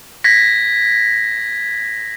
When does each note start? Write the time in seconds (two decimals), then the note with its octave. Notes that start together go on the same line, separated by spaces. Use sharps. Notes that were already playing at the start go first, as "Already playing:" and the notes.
0.24 G#6 A#6 B6